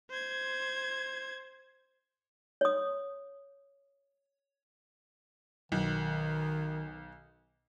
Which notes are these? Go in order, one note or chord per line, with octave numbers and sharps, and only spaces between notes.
C5 G#6
C#5 D#6
B1 D#3